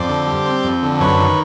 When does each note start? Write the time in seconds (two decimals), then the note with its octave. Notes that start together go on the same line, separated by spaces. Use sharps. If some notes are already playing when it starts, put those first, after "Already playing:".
Already playing: F2 C5 D5
0.09 D3
0.27 G3
0.46 C4
0.64 F2
0.83 D3
1.00 F#2 B4 C#5
1.19 D#3